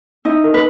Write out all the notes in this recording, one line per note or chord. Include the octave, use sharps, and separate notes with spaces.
D#4 E4 D#5
A#4
B4